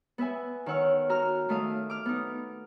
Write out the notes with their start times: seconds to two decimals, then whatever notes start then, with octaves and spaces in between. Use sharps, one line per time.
0.18 B3 B4 E5 G#5
0.66 D#3 C#5 F#5 E6 F6
1.09 F#4 A#5 F6
1.49 D#3 A3 D#5 F5
1.90 D6 F6
2.06 B3 D#4